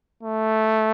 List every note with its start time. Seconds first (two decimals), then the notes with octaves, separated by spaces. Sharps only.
0.23 A3